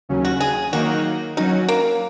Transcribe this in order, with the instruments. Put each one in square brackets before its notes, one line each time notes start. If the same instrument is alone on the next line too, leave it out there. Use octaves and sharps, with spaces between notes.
[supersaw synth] D#2 C#3 F#3 C#4
[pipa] F#4
G#4
[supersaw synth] D#3 F#3 A#3 D#4 A#4 [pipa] F#4
[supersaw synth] F#3 C#4 F#4 [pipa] D#4
[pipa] A#3